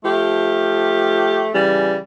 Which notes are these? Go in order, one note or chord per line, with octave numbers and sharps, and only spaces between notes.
F3 A3 G4
C#3 E3 G3